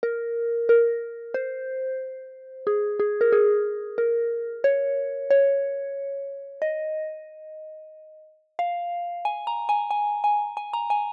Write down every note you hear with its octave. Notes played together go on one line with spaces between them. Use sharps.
A#4
A#4
C5
G#4
G#4
A#4
G#4
A#4
C#5
C#5
D#5
F5
G#5
A#5
G#5
G#5
G#5
G#5
A#5
G#5